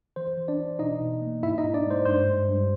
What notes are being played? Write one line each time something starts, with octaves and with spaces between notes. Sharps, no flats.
E3 C5
E3
D4 D5
E3
B2 D#4 D#5
B2
A#3
G#2 E4 E5
D#4 D#5
G#2
D4 D5
G#3 C5
G2 C5
G2
G2